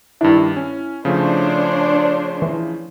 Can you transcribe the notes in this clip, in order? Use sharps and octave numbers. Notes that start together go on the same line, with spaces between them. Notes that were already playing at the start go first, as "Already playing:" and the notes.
G2 D#3 D4 E4
C#4
C#3 F3 A3 D4 C5 C#5
E3